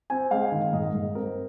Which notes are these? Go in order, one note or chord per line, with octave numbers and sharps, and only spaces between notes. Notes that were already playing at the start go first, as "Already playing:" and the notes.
C4 G#5
G#3 F5
D#3
G#2 D#5
G#2
C4 A#4